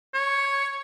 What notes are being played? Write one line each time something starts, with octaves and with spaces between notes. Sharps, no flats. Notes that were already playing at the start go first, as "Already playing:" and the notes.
C#5